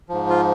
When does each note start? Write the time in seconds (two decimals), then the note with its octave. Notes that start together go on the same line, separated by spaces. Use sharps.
0.09 G#2 F3
0.30 F4